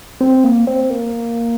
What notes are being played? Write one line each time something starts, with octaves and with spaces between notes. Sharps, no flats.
C4
A#3
C4
A#3